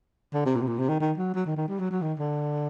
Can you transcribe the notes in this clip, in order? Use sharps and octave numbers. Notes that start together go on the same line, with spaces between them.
D3
C3
A#2
C3
A#2
C3
D#3
D#3
F#3
F#3
D#3
D#3
G3
F#3
F#3
D#3
D3